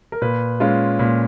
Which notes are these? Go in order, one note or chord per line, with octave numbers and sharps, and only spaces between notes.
A#4
A#2 B4
G#3 C#4 F4
A#2